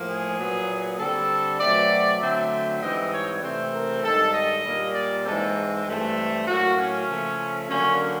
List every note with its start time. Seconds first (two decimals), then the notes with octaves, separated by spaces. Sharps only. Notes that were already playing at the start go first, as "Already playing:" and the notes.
Already playing: A2 F3 A#3
0.09 G#4
0.39 A#2 F#3 B3
0.99 D3 G3 C4 A4
1.60 B2 F#3 A3 C4 D5
2.21 D3 F#3 A3 C4 E5
2.82 G#2 E3 G3 C4 D#5
3.13 C#5
3.43 C3 E3 A3 C4
3.74 A#4
4.04 G2 D#3 G#3 A4
4.34 D#5
4.64 A#2 G3 A#3
4.95 D5
5.25 G#2 E3 G#3 C4 A4
5.86 G2 E3 A3 C4
6.47 A2 F#3 A#3 F#4
6.78 C#4
7.08 C#3 F3 A3
7.69 D3 F#3 A#3 C#4